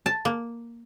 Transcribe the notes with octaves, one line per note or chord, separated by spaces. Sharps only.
A5
A#3